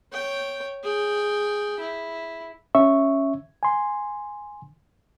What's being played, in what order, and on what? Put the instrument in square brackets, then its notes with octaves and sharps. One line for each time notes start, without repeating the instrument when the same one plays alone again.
[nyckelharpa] C#5 G5
G#4 G5
E4
[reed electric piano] C#4 E5 C#6
G#5 C6